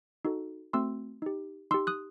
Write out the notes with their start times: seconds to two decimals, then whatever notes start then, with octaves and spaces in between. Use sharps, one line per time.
0.25 D#4 F#4 A4
0.73 A3 C4 F#4 C6 E6
1.22 D#4 G4
1.71 D#4 G4 C6 E6
1.87 D#6 F#6